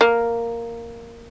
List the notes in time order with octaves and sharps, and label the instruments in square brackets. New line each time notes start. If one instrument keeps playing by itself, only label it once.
[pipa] A#3